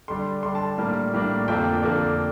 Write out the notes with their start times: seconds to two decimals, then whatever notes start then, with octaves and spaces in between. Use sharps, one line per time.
0.08 D3 G3 D4 C6
0.43 D3 G3 D4 C6
0.55 A5
0.78 A2 G3 A#3 D4
1.13 A2 G3 A#3 D4
1.48 F2 D3 F3 A#3 D4 G5
1.82 F2 D3 F3 A#3 D4